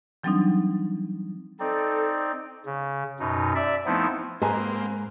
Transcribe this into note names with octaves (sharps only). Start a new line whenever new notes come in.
E3 F#3 G3 C4 D4 D#4
C4 D#4 A4 D5
C#3
F#2 B2 D#4
D5 E5
F3 A3 B3 C4 D#4 E4
G#2 A#3 C4 B4 G#5 A#5